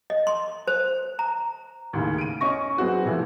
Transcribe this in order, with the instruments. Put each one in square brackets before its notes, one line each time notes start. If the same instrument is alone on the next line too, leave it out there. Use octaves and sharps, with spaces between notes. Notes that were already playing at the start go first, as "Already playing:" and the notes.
[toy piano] D#5
C6
C5
A#5
[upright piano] D#2 A2 C#3
D7 D#7
C#4 D#5 C#6 A#6
F#3 B3 C4 F#4 G#4
C3 E3 F3 A3